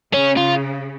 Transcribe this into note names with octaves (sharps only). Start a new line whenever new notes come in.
C#3 C#4
F4